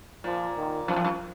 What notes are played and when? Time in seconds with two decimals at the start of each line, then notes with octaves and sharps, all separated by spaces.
0.24 A#2 F3
0.57 D#3
0.88 F#2 F3
0.96 F2
1.04 F#2